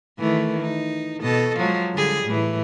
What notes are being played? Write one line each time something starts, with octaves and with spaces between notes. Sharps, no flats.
D#3 E3 A3
D#4
B2 A4 D#5
F3 F#3 G#3
D3 G3 G#4
A2 E3